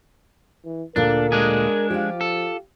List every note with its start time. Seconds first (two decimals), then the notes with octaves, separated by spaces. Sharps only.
0.65 E3
0.96 D2 A#2 D4 A4 A#4
1.32 G#3 D4 G#4
1.90 F3 F4 G4
2.21 A4